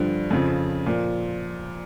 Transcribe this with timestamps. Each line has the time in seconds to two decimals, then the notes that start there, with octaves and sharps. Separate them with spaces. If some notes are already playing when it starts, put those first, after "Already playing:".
Already playing: G2 D3 F3
0.31 F2 C#3 F3
0.86 A#2 F3